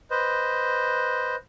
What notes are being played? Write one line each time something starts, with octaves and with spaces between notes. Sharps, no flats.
B4 C5 D#5